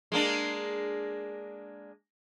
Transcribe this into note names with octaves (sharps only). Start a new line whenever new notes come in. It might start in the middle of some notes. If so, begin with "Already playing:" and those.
G#3 A#3 D4